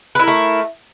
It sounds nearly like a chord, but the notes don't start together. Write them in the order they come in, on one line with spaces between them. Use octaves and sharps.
B4 E4 A#4 A3